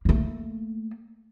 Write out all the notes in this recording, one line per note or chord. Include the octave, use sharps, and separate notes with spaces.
A3 A#3